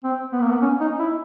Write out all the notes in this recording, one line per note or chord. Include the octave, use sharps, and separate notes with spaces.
C4
B3
A#3
B3
C#4
D#4
E4